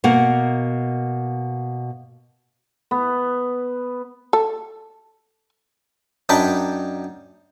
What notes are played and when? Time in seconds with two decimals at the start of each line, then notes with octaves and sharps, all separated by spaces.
0.04 B2 A#3 A#4 F#5
2.91 B3
4.33 A4
6.29 F#2 D4 D#4 G5 A5 B5